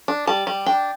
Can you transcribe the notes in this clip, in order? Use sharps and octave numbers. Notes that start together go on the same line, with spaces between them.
D4
G3 A5
G3
D4 G5